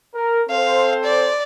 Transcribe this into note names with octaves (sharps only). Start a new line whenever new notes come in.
A#4
C4 A4 C5 F5
D5